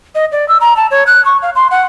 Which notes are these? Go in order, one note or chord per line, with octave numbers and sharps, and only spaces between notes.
D#5
D5
E6
A#5
A5
C#5
F#6
C#6
F5
C6
F#5